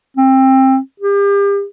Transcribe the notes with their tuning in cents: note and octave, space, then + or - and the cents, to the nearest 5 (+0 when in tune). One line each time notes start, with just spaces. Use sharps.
C4 +20
G4 +35